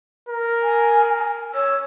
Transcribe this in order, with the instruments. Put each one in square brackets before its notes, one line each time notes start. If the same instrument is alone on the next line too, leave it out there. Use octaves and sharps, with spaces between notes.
[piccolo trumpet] A#4
[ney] G#5
[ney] C#5 [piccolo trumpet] E6